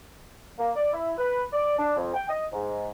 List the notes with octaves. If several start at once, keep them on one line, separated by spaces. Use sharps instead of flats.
A#3
D5
E4
B4
D5
D4
F2
G5
D#5
G#2